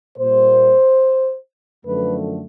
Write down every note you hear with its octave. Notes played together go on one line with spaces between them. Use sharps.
A#2 G3 A#3 C5
F#2 D3 F3 A3 B4